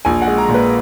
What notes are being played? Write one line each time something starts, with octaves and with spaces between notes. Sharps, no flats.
A#1 G#5
F#5
G#3
A#5
A#2
B4